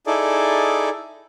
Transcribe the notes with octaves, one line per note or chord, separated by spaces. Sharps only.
D#4 E4 G#4 A4 D5